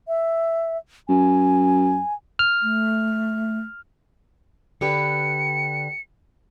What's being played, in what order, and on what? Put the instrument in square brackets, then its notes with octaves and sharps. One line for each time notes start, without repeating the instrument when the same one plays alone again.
[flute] E5
[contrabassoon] F#2 [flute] G#5
[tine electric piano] F6
[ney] A3
[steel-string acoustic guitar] D3 G4 B4 [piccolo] C#7